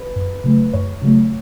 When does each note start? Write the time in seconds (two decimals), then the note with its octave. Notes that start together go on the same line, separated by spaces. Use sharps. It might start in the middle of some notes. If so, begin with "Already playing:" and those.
Already playing: B4
0.16 F#2
0.44 C#3 F#3 A3
0.73 F#2 C#5
1.02 C#3 F#3 A3